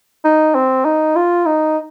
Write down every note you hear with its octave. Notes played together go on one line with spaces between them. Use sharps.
D#4
C4
D#4
F4
D#4